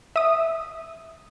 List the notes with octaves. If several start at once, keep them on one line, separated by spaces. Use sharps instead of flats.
E5 D#6